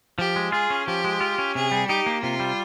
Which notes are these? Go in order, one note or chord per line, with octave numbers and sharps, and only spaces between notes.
F3 G4
G#3
F4 G#4
C#4
F3 G4
G#3
F4
C#4
C3 G#4
G3
D#4 G4
A#3
C3 F4
G3